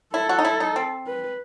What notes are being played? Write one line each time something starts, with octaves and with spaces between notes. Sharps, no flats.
E4 A4
F#4
D#4
E4
D#4
C4
B4